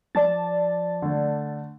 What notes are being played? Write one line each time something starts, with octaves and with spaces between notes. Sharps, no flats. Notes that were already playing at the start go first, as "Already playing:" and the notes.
F3 D5 A5 A6
D3 A3